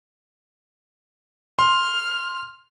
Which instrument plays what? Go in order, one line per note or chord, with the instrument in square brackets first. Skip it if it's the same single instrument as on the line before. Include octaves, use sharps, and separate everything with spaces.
[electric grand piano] C6 [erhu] F6